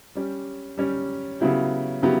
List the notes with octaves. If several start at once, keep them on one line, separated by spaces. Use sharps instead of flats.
G3 C#4 G4
G3 C#4 G4
C#3 F#3 B3 E4 G4
C#3 F#3 B3 E4 G4